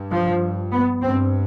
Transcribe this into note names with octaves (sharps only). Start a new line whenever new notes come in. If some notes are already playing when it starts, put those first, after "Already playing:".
Already playing: G2
F3
B3
G2 C4